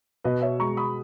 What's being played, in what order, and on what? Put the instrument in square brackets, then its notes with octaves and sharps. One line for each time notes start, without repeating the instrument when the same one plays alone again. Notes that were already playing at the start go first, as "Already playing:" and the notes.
[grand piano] B2 [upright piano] B4 D#5
[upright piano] C#5 E5
[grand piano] G#3 [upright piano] A#5 C#6
[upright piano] B5 D#6